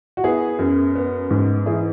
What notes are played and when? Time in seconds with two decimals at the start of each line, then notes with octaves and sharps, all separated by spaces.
0.17 F#4
0.24 B3 E4 G#4
0.59 F#2
0.95 B3
1.31 G#2
1.66 E3 E4 G#4